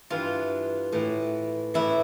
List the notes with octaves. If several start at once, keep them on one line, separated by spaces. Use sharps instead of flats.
G2 E3 F4
A2 E3
A2 E3 E4